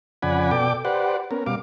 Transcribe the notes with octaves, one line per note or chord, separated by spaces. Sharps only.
F2 C#3 D5 F#5 G#5 B5
B2 A4 D5 G5 D6
G4 B4 C5 D5 F#5
B3 C#4 A#4
B2 G3 F5 D6